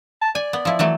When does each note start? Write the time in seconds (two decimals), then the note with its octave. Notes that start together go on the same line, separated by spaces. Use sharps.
0.22 A5
0.35 D5 G#5
0.53 B3
0.65 F3 E4
0.79 E3 F#3 A3